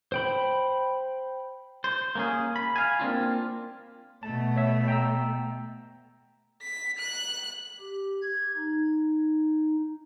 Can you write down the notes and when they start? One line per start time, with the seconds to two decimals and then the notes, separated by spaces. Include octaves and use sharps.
0.12 C5 G5 B5
1.84 C5
2.15 A#3 C#4 G#4
2.56 B5
2.76 F5 G#5
2.99 A#3 C4 D4 F4
4.23 B2 A3 A5
4.56 C#5 E5
4.88 G5 A#5 E6
6.62 B6
6.99 F#6
7.80 G4
8.22 G#6
8.56 D#4